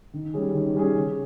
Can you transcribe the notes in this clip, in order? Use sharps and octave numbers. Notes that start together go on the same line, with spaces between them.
D#3
G3 C#4 G#4
D#3
G3 C#4 G#4
C#3